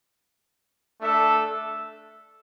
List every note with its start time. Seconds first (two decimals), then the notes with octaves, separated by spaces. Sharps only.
1.00 A3 D4 A4 E5